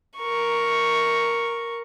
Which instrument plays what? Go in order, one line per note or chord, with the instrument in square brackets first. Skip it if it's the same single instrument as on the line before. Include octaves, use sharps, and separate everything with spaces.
[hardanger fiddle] A#4 C#6